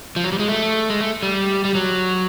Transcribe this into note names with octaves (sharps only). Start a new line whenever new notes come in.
F3
F#3
G3
G#3
A3
G#3
A3
G3
G3
F#3